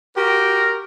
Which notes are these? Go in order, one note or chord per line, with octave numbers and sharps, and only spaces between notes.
F#4 G4 A#4